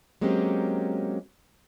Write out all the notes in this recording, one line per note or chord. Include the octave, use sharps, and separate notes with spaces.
F#3 G#3 A#3 C4 C#4 G4